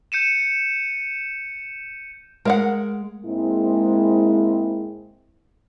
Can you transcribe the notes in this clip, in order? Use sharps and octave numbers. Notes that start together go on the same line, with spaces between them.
G6 C#7 D#7 E7
G#3 A#4 F5 F#5
G#2 G#3 A#3 C4 E4